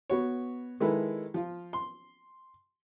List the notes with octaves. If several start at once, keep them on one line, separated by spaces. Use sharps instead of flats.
B3 F#4 C#5
D#3 G#3 E4 A4 B4
F3 F4
C6